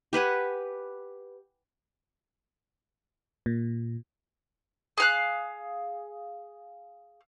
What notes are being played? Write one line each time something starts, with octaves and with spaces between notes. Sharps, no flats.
G4 B4 F#5 G#5
A#2
G#4 F5 F#6